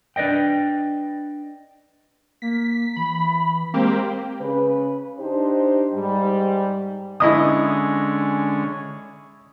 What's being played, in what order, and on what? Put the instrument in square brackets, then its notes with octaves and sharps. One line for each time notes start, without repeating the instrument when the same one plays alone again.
[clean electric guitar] D4 B4 D5 D#5 G5
[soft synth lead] A#3 [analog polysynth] B6
[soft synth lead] E3 [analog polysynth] B5
[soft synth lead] G#3 [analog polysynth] A#3 C4 G4
[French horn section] C#3 B4
D4 D#4 G4 C5
G#2 G3
[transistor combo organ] D3 G#3 C#4 [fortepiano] E4 D#5 D#6